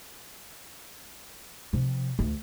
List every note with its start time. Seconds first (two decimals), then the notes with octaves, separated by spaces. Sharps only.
1.73 C3 F3
2.19 D2